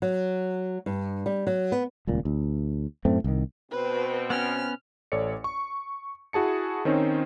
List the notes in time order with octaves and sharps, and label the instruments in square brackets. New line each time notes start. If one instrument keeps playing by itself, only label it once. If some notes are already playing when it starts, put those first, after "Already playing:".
[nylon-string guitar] F#3
G2
G3
F#3
B3
[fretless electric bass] D#1 C#2 A#2
D2
F#2 A2 A3 C4
C2 D#3
[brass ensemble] B2 C4 [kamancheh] B4
[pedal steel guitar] B3 C#4 [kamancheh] F6
[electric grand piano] A1 A4 C#5 D5 C#7
C#6
E4 F#4 G#4 A5 C#7
D#3 C4 C#4 D#4 C5 C#5